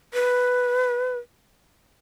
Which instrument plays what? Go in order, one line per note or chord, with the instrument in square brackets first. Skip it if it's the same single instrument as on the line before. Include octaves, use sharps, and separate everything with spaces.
[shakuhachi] B4